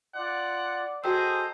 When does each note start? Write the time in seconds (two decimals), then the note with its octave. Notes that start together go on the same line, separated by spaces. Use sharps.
0.15 F4 D5 F#5
1.04 F#4 G#4 A4 C5 D#5 G5 A#5 E6